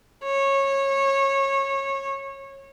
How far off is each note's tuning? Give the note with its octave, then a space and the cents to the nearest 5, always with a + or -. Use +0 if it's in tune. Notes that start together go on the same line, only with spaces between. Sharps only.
C#5 -20